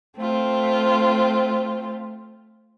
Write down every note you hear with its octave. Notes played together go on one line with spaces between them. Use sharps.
A3 C4 F4